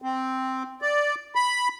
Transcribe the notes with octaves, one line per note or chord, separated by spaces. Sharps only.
C4
D5
B5